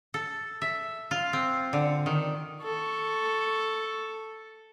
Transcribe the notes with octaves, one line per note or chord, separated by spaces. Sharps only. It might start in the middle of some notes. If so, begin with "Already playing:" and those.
A4
E5
F4
C4
D3
D#3
A4 C#6